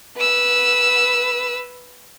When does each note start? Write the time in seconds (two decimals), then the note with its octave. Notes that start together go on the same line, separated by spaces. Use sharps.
0.17 B4 E6